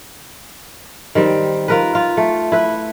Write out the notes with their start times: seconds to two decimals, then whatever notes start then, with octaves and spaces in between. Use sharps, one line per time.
1.15 D#3 G3 C4
1.68 F4 A#4 B4
1.95 F4
2.17 A3
2.52 E4 B4